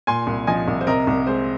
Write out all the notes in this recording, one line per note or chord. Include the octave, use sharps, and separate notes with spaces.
A#2 G#5 C6
C2
F3 D#5 G#5
C2
C5
C3 A#4 D#5
C2
G#3 C5